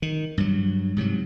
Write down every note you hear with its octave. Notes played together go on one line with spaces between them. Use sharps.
D#3
G2 F#3
G#2 C3 F3 F#3